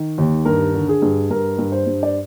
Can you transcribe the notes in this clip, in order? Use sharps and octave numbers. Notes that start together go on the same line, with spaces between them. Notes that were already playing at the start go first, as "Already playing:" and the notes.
Already playing: D#3
D#2
G2 A#4
D3
G#4
G2
G2 A#4
G2
C5
G2
D5